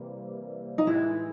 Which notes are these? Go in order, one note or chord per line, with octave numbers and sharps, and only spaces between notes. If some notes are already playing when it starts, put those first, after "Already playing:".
Already playing: C3 E3 G3 A#3
D#4
A2 E3 G#3 E4